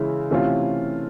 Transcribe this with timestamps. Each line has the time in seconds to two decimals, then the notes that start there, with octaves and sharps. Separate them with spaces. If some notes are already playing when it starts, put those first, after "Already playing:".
Already playing: C#3 E3 G#3 C#4 E4
0.31 C3 E3 A3 C#4 F4